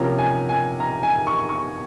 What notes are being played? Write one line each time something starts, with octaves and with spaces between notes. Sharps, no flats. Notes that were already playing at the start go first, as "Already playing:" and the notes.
Already playing: C3 F3 A#3 C#4 A#5
G#5
G#5
A#5
G#5
C#6
C#6